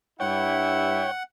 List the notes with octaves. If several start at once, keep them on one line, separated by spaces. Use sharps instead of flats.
G2 E4 C#5 F#5 G5